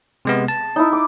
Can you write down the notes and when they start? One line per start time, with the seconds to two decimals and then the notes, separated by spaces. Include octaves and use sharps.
0.25 C3 G#3 B3
0.48 A5
0.76 D#4 E4
0.93 D6